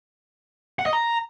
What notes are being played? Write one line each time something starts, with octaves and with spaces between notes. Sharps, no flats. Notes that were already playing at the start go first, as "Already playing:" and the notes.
F#5
D#5
A#5